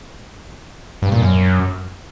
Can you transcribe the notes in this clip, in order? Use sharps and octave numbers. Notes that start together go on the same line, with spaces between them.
G2
A#2
F#2